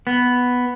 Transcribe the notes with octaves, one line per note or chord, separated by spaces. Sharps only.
B3